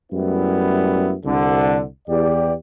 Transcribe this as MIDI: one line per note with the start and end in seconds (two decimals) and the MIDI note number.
0.12 1.14 42
0.12 1.14 55
0.12 1.14 57
0.12 1.14 59
0.12 1.14 64
1.26 1.84 36
1.26 1.84 50
2.08 2.54 40
2.08 2.54 67
2.08 2.54 74